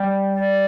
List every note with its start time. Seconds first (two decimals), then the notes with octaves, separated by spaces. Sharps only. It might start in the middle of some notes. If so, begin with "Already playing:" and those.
Already playing: G3
0.33 D5